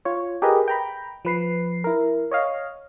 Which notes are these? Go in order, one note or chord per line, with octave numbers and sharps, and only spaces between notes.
F4 C#5
G4 G#4 A#4 B4 D#5
G5 A#5 B5
F3 B4 C7
E4 A#4
C#5 D#5 F5